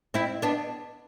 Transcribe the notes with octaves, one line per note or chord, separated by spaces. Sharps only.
C4 E4
B3 D4